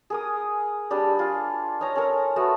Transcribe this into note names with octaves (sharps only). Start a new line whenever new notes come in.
G#4 A#4 D#6
G3 D4 G#4 G5
F4 G#4
D#4 C#5 G#5 A#5
C#4 A4 A#4
A3 B3 F#4